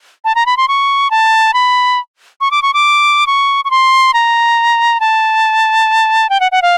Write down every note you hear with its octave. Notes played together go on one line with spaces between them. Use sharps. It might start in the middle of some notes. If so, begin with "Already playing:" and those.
A5
A#5
B5
C6
C#6
A5
B5
C#6
D6
C#6
D6
C#6
C#6
C6
A#5
A5
G5
F#5
F#5
F5